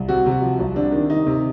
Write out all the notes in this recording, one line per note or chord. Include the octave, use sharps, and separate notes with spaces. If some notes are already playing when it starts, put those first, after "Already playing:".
Already playing: C2
C3 F#4
C3
F#4
F3
C2
C3 D4
D#3
D#3 D#4
C3